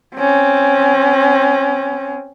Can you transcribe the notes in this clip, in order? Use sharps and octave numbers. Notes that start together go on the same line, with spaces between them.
C4 C#4